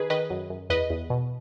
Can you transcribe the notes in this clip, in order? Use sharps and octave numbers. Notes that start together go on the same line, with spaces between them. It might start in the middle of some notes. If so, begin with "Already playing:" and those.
Already playing: D#3 G#4 B4
D#3 B4 D#5
F#2
F#2
E2 B4 D#5
E2
B2